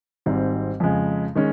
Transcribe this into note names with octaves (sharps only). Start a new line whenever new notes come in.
G#1 G#2 G3 C4
F2 C#3 G#3
D#3 G#3 C#4